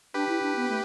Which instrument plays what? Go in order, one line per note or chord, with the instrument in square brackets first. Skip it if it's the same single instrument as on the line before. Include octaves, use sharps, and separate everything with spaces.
[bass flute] D4 [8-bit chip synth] G4 B4
[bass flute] E4
D4
B3
A3